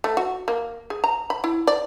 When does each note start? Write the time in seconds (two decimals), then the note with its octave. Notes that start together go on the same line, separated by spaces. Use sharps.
0.04 A3
0.17 F#4
0.48 A#3
0.90 G#4
1.04 A#5
1.30 B5
1.44 E4
1.67 D5